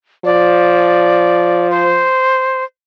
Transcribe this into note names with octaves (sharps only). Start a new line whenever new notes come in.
F3 D5
C5